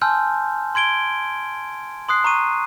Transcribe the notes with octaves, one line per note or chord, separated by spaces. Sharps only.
G#5 A5 C6 E6 F6 G6
C6 G#6 D7 G7
C6 D#6 F#6 C7
A#5 C#6 D#7